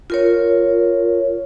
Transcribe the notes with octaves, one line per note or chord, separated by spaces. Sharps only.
F4 A#4 C#5